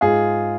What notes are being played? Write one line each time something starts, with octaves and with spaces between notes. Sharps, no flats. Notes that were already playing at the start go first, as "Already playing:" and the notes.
G#2 F4 G#4